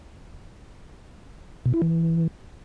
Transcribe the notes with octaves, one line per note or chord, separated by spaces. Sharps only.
B2
E4
E3